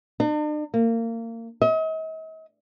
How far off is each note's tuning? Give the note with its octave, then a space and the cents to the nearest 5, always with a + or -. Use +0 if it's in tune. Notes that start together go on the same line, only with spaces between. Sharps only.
D4 +45
A#3 -30
D#5 +45